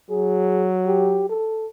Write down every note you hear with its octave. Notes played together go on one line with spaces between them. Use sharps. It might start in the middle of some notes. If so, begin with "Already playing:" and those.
F#3 G#4
G4
A4